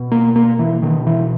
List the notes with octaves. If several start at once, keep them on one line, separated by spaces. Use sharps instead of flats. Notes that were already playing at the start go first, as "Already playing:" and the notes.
Already playing: B2
A#3
A#3
E3
B2 D#3
E3